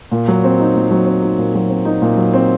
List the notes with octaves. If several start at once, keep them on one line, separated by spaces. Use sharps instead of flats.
A#2
F#3
C4
D#4
A#2
F#3
C4
D#4
A#2
F#3
C4
D#4
A#2
F#3
C4